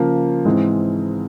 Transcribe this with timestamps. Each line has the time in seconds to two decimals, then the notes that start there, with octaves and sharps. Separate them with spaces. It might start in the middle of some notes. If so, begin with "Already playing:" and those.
Already playing: C#3 F3 A#3
0.45 G#2 E3 G#3 C4